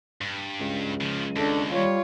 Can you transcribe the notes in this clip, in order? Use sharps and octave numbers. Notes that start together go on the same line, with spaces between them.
G2
C#2
C#3 F3
D#2 D4 A4
G3 F4 C#5